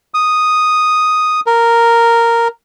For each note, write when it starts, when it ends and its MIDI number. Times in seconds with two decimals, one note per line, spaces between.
0.14 1.40 87
1.46 2.48 70